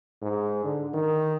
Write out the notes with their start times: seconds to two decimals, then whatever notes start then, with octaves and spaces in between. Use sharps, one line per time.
0.22 G#2
0.64 D3
0.94 D#3